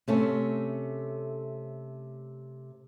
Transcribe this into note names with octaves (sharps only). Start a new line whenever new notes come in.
C3 A3 C#4